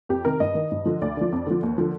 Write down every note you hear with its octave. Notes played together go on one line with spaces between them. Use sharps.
F2 G4
C3 D#3 A#4
G2 D#5
D#3
G2
D3 F3
D2 D5
D3 F3
F2
D3 F3
D#2
D3 F3